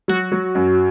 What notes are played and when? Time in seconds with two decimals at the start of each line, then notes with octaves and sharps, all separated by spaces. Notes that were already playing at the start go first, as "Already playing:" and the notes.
0.08 F#3 F#4
0.32 F#3
0.55 F#2